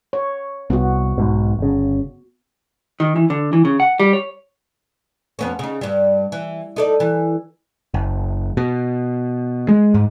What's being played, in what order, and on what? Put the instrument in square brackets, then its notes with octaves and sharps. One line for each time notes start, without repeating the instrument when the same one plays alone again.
[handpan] C#5
[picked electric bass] C2 [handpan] B3 F#4
[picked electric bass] B1 G#2 B2
G1 C#3
[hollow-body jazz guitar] D#3
E3
D3
E3
C#3
F#5
G3
C#5
[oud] F2 B3 C#4
C#3 D#4
G2 G3
E3
D#4 A4 D5
E3
[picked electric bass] F#1
B2
G#3
G#2